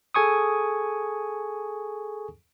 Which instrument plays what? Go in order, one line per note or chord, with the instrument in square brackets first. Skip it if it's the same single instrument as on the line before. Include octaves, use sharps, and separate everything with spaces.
[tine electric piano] G#4 A4 G#5 C#6 D#6